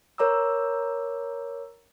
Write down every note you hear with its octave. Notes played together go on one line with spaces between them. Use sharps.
A#4 C#5 A#5 D6 E6